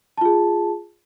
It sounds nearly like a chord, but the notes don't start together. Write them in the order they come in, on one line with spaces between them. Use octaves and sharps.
A5 F4 G#4